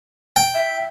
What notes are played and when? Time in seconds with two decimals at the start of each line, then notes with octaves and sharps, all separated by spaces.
0.36 G5
0.55 E5